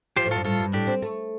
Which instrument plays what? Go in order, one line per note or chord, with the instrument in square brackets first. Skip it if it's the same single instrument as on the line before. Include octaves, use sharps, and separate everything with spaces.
[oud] F3 [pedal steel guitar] G4 C5
[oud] A2
[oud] G2 [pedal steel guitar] F4 A4
[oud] A2 [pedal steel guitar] F4 A4
[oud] G2
[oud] A2 [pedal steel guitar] D4 G4
[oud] C4
A3